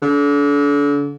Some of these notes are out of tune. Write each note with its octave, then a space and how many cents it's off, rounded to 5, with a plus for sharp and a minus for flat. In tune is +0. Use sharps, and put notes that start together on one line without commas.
D3 -35